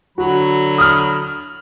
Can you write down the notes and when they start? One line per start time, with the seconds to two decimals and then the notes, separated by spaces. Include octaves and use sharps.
0.18 D3 F#3 F#4 B5
0.78 D#6 F6